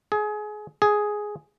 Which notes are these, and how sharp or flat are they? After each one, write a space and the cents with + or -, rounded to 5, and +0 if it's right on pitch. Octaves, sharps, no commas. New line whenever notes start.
G#4 +25
G#4 +5